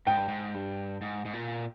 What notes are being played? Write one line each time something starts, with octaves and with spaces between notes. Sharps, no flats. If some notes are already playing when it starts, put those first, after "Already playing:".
G#2 G5
G2
G#2
G2
G#2
G#2
A#2